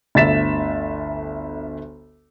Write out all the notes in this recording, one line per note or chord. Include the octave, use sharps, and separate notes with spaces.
G1 D2 E5 A6 B6 E7